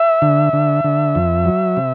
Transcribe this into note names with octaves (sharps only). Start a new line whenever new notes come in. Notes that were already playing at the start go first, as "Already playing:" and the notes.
Already playing: E5
D3
D3
D3
F2
F#3
C3